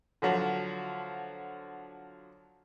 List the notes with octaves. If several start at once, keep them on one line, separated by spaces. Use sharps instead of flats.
D3 F3 F#3